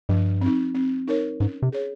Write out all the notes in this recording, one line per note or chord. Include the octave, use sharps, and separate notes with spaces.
G2 F3
C4 D#4
C4
D#4 A#4 C#5
G#2 C#4
C3
G#4 C#5